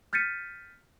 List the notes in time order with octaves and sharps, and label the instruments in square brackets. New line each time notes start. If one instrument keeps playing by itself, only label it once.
[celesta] F6 G6 A6 B6 C#7 D#7